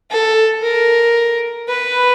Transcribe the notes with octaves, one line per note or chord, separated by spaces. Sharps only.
A4
A#4
B4